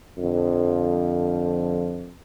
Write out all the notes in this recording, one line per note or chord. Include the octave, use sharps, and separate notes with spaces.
F2 D3 F3